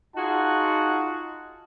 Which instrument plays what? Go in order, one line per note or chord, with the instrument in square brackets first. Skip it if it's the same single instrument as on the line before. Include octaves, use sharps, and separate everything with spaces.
[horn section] D#4 F4 F#4 G#4 F#5 A5